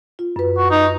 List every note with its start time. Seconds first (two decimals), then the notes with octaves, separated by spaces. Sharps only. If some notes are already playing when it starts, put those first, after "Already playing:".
0.19 F4
0.36 F#2 B4
0.57 F#4
0.71 D#4